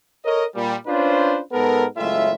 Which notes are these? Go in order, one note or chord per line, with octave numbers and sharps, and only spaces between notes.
A4 A#4 C#5 D#5
A#2 G3
C#4 D4 F4 B4 C5
G#2 B3 A4 A#4
F#1 A2 G#3 F4 E5